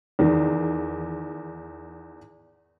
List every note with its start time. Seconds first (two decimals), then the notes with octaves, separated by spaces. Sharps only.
0.19 E2 D#3